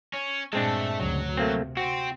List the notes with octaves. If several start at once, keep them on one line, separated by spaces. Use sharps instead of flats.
C#4
G2 A#2 G#3 A3 C4 D4 A4
D2 C#3 F#3
C3 A3 A#3 C4
C4 F#4